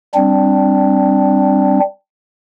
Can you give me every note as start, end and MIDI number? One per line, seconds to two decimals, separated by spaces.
0.15 1.80 55
0.15 1.80 60
0.15 1.80 62